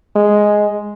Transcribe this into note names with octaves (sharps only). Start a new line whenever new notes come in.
G#3